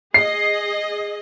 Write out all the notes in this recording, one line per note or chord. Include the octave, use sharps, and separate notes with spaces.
G#4 D#5 C7